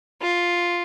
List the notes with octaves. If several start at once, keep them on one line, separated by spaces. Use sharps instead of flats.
F4